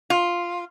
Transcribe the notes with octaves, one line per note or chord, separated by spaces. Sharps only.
F4